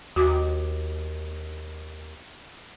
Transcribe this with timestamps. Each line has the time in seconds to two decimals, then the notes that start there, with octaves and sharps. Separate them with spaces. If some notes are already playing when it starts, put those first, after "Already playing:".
0.16 D#2 F#4 D6